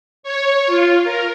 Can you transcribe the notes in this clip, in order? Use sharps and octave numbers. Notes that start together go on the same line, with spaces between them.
C#5
F4
A#4